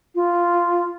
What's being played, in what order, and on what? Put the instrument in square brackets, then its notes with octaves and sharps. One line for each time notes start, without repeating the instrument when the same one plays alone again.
[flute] F4